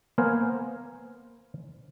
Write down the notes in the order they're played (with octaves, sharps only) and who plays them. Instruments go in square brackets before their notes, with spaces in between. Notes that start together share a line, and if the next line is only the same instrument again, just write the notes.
[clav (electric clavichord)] A#3 B3 A#4 C5 F5 G#5